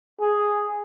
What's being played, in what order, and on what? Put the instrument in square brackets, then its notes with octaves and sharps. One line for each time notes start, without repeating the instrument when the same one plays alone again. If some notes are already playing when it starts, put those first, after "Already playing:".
[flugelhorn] G#4